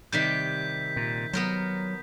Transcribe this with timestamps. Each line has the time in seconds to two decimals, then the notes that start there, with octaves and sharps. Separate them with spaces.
0.12 C3 D#3 G3 G6 B6
0.96 A#2
1.33 F#3 B3 A#4 C5